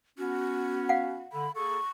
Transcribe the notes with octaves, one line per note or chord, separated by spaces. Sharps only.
B3 C#4 F#4
F5 F#5
D3 B5
A#3 G#4 A4 C#6